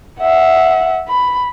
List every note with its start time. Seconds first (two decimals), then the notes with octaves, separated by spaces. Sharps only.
0.21 E5 F#5
1.09 B5